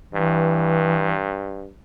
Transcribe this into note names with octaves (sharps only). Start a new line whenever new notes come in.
G2 E3